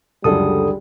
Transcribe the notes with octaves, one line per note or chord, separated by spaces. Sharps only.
C#2 F#2 D3 G3 G#4 A4 D#6